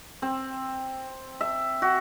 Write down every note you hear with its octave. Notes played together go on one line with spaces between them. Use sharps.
C4
E5
F#4